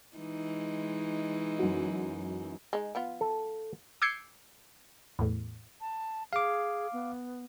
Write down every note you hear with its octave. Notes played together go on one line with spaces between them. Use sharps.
E3 G#3 D#4
F#2 F#4
G#3 D#4
F3 B3 F4
A4
D6 E6 G6 G#6 C7 C#7
E2 A2
A5
G#4 F5 D6
B3